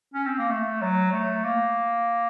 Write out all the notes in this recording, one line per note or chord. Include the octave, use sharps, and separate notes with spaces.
C#4
C4
A#3
A3
F#3
A3
A#3